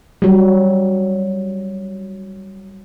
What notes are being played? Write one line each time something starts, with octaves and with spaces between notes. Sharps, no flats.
F#3 G3